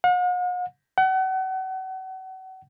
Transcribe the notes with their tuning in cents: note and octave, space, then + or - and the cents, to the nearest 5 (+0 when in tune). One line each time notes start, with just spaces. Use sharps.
F#5 -45
F#5 +35